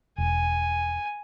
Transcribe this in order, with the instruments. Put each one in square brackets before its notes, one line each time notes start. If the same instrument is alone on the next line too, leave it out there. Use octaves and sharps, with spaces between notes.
[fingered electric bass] E1 [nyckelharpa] G#5